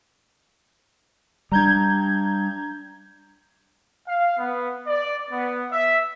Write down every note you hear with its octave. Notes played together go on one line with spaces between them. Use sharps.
G3 D4 A#5 G6 G#6
F5
B3
D5
B3
E5